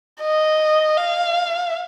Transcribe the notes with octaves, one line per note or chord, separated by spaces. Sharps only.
D#5
F5